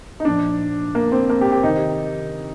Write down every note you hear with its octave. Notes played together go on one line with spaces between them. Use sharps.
D#4
A#2 F3 D4
A#3
C4
A#3
G4
G4
C3 D#3 D#4